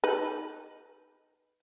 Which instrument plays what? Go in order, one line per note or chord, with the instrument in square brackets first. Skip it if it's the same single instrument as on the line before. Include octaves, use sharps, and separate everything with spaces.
[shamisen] D#4 B4